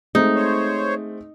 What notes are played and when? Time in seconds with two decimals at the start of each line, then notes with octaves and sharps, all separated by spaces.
0.15 G#3 A3 C4 D#4
0.36 C5 C#5